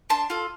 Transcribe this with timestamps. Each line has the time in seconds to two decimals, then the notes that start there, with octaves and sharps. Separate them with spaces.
0.10 D4 A5 C6
0.30 F4 A4